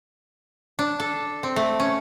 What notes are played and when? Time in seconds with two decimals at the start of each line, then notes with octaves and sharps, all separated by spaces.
0.79 D4
1.00 A4
1.43 C4
1.56 A3
1.80 C#4